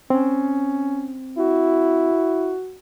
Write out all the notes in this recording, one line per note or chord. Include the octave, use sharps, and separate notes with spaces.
C4 C#4
E4 F#4